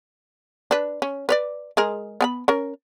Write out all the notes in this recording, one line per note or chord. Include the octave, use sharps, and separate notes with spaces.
D4 B4
C#4
B4 C#5 D5
G#3 G#4 A#4
B3 G#5 B5
C#4 A#4